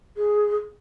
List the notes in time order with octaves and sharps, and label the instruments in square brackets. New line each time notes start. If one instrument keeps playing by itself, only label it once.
[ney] G#4